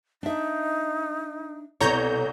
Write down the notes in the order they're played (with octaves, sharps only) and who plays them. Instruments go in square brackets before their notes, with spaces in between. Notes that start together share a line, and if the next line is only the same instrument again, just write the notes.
[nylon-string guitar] D4 E5 [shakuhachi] D#4
[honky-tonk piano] C2 D5 [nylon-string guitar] B2 A4 [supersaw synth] C#5 A#5 G6